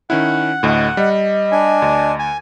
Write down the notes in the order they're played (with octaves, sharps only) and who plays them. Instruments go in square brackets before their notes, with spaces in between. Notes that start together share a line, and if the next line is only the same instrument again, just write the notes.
[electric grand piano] D#3 C#4 E4 [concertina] F#5
[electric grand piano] D2 A2 [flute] D#5
[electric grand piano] G3 [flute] D#5
[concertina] D4 G#5
[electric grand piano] D2
[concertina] G#5